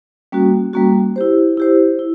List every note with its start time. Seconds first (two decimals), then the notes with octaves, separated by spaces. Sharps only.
0.32 G3 A#3 C#4 F#4
0.73 G3 A#3 C#4 F#4
1.16 E4 G4 C5
1.57 E4 G4 C5
1.99 E4